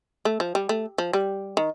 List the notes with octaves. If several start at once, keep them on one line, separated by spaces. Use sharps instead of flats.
A3
F3
G3
A3
F3
G3
D#3